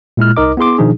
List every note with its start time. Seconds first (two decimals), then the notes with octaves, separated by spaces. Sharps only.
0.17 A#2 G#3 E4 F6
0.37 C2 D#4 A#4 D#5 D6
0.57 B3 E4 G#4 C6 D6
0.78 B2 D#3 F3 D4 D#4 G#4